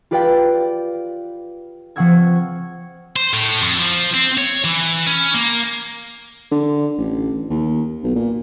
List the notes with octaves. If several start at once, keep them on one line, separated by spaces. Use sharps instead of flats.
F4 G4 B4 D5 F5 G5
F3 C4 F#5 C#6 E6 G#6
C5
A2
F2
F3
C4
C#5
E3
C#4
A#3
D3
A1
D#2
B1
A#2